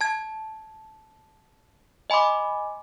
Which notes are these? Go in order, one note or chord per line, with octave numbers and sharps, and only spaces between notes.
A5 G#6
D#5 G#5 B5 C6 D6